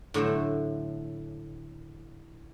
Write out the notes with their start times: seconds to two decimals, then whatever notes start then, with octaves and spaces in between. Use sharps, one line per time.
0.14 A2 D3 F#3 A3 C5